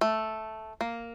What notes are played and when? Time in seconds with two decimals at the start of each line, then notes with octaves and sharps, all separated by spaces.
0.01 A3
0.81 A#3